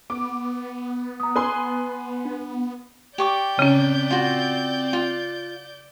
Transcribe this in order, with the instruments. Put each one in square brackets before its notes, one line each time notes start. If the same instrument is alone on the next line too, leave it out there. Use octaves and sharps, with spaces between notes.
[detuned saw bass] B3 [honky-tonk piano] D6
[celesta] A#5 D#6
[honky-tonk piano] B4 G#5 C6
[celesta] D4
[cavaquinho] G4 C#6 D6 [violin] D5 G6
[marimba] C#3 C#4 [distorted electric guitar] C4 A#5
[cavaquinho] F4 F#4
F4